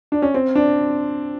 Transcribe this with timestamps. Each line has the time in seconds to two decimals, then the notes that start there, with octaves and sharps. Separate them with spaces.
0.12 D4
0.22 C#4
0.34 C4
0.55 D4